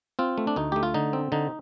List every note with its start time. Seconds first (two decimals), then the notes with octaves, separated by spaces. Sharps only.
0.19 C4 F4
0.38 A3
0.47 D4
0.56 D2 D#4
0.72 A3 G4
0.83 F4
0.94 D3 D#4
1.13 C4
1.32 D3 D#4